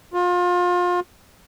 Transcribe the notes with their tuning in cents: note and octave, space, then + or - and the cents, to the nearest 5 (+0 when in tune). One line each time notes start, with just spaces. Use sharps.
F4 +30